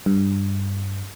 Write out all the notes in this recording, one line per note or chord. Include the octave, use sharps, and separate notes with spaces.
G2